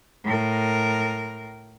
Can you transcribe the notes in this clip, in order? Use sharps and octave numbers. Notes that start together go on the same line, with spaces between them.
A2 A#4